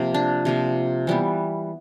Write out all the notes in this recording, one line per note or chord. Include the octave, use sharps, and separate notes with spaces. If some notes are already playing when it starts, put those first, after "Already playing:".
Already playing: C3 F3 A#3
D4
C3 F3 A#3
E3 G3 B3